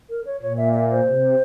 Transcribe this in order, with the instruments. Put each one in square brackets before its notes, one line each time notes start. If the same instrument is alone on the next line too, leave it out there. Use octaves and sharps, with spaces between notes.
[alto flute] A#4
C#5
[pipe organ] A#2 [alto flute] C#5
[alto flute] E5
E5
C5
[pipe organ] C3